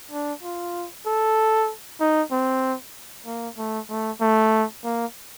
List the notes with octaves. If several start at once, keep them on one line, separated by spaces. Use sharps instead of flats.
D4
F4
A4
D#4
C4
A#3
A3
A3
A3
A#3